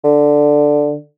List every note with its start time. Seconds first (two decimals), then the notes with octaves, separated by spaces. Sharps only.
0.04 D3